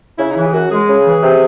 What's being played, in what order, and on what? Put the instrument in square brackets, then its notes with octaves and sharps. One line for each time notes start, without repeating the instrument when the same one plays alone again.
[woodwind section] C#3 [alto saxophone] E4
[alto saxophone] D#4
[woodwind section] E3 [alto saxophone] E4
[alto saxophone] G#4
[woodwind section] F#2 [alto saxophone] F#4
[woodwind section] G#3 [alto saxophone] G#4
[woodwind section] C#3
E3
C3